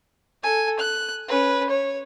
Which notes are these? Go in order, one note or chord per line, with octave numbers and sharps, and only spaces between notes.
A4 G#5
F#6
C#4 B4
C#5